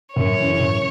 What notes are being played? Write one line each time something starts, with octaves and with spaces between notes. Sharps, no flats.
F#2 C#5
C#3 E3
F#2